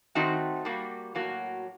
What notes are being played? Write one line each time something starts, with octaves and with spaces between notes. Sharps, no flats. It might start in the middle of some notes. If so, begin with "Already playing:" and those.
D#3 A3 C4 D#4 F#4
G3 A#3 F#4
A2 F#3 A#3 F#4